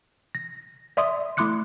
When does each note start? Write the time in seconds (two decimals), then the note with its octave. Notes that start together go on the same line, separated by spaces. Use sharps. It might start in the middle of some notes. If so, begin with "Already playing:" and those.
0.35 A#6
0.97 D5 E5 C6 D#6
1.37 A3 E4 C6 D6 F#6 C#7